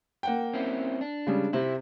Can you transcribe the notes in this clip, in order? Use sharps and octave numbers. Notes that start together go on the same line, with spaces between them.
A#3 F#5 G5
C4 C#4 E4
D4
C#3 G3 G#3
C3 C4 E4